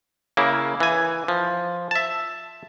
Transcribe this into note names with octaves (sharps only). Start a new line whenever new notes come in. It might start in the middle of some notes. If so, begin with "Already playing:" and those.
C#3 A#3 E4
E3 G#5
F3
E5 A5